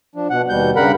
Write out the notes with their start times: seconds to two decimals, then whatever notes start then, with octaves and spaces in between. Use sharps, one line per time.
0.16 F3 D4
0.30 B2 F#5
0.49 D#2 B2 G3 G6
0.76 G2 C#3 G3 A#4 F#5 B5